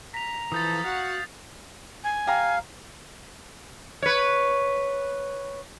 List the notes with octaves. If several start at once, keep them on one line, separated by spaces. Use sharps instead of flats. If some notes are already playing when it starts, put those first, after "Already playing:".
A#5 B6 F7
E3 F3 A4 D#6 G6 A6
F#4 F5 F#5
G#5
G4 F5 A#5
B4 C#5